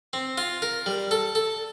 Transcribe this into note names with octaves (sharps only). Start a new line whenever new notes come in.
C4
F4
A#4
G3
A4
A4